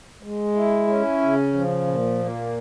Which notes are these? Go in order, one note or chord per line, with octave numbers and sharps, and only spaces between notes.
G#3
E4
C#4
C#3
F3
A#2
A#3